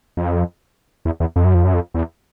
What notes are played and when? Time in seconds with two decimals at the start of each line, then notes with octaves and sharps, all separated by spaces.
0.17 F2
1.05 E2
1.20 E2
1.36 F2
1.44 F#2
1.54 F2
1.64 F#2
1.74 F2
1.94 E2